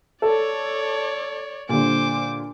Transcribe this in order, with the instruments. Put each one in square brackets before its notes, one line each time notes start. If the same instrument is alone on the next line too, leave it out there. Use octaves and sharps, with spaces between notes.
[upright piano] A4 [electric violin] C#5 D5
[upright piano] A#2 D3 G3 [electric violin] C5 D6